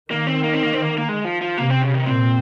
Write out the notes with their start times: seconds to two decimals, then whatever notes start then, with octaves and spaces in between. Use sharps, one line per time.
0.11 D#3 A#3
0.27 C4
0.43 A#3
0.54 C4
0.63 A#3
0.73 C4
0.82 A#3
0.98 A#3
1.09 G#3
1.25 F3
1.41 F3
1.58 C3 A#3
1.70 C4
1.82 C#3
1.94 D#3
2.06 A#2 C4